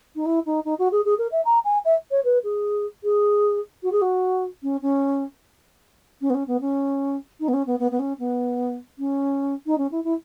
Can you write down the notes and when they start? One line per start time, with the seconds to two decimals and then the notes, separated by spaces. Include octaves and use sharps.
0.15 D#4
0.25 E4
0.46 D#4
0.65 D#4
0.79 F#4
0.91 G#4
1.05 G#4
1.18 A#4
1.31 E5
1.45 A#5
1.64 G#5
1.85 E5
2.11 C#5
2.24 B4
2.44 G#4
3.03 G#4
3.83 F#4
3.92 G#4
4.01 F#4
4.62 C#4
4.82 C#4
6.21 C#4
6.30 B3
6.34 C#4
6.47 B3
6.61 C#4
7.40 D#4
7.48 B3
7.53 C#4
7.66 B3
7.79 B3
7.91 B3
7.99 C#4
8.19 B3
8.98 C#4
9.66 D#4
9.78 C#4
9.91 E4
10.04 E4